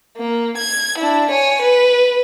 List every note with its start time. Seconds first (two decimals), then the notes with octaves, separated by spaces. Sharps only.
0.17 A#3
0.58 G#6
0.98 D4 E4
1.31 C#5 G#5
1.62 B4